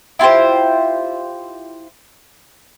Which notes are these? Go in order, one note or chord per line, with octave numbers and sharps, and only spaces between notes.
E4 F4 G4 C5